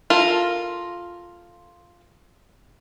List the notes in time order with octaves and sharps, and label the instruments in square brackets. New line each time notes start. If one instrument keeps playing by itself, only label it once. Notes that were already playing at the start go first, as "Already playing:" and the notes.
[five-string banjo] F4 A4 A#4